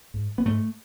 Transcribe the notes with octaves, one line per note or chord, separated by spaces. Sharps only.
G#2
B3
G#2 A3